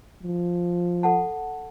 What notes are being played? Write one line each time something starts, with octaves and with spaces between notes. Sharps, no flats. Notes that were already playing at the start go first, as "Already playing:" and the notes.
F3
A4 F#5 A5